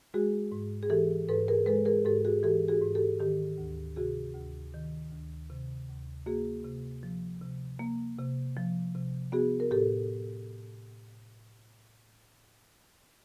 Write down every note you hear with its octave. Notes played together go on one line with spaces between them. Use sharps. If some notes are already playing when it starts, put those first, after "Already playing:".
G#3 F#4 G#4
G#2
G#4
E3 G4 A4
G#2 A4 B4
G#4 A#4
G#3 A4 B4
G#4 A#4
G#2 G4 A4
F#4 G#4
E3 G4 A4
F#4 G#4
G#2
G4 A4
D#3 G4
D2
C3 F#4 G#4
D2
D#3
D2
C3
D2
A#3 F#4 G#4
C3
F3
C3
A#3
C3
F3
C3
B3 F#4 G#4
A#4
A2 G4 A4